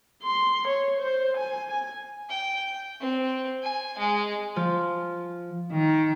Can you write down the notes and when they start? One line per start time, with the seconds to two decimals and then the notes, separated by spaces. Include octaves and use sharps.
0.23 C6
0.68 C#5
1.00 C5
1.37 G#5
1.69 G#5
2.30 G5
3.01 C4
3.63 G#5
3.98 G#3
4.56 F3
5.72 D#3